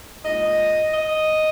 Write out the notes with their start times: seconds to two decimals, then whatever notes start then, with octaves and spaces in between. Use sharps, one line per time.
0.24 A#2 G#3 D#5
0.92 D#5